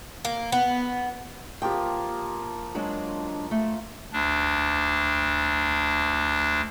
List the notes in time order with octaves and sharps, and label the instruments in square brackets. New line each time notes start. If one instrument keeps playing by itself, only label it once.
[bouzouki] A#3
B3
[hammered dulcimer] F3 A#3 F4 [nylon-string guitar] G4 G5
[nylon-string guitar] F#3 G#3 D4
A3
[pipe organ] D2 D4